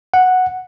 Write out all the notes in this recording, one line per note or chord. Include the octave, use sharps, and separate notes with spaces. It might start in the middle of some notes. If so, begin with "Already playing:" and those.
F#5